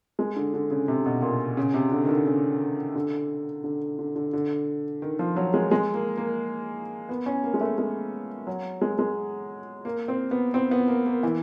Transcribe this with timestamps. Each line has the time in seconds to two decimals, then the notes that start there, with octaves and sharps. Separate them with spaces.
0.19 G#3
0.36 D3
0.54 D3
0.71 C#3
0.88 C3
1.06 B2
1.22 A#2
1.57 C#3
1.74 C3
1.92 D3
2.05 D#3
2.09 D3
2.26 C#3
2.95 D3
3.64 D3
3.99 D3
4.16 D3
4.33 D3
5.02 D#3
5.19 F3
5.36 F#3
5.54 G#3
5.71 G#3
5.94 A#3
6.17 A#3
7.09 B3
7.26 C#4
7.44 A#3
7.54 G#3
7.61 A3
7.78 G#3
8.47 F#3
8.81 G#3
8.99 G#3
9.85 A#3
10.08 C4
10.31 B3
10.54 C4
10.71 B3
10.88 A#3
11.06 A#3
11.23 E3